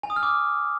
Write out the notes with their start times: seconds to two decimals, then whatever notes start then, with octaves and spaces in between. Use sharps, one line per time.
0.03 G#5
0.10 D#6
0.16 F6
0.23 D6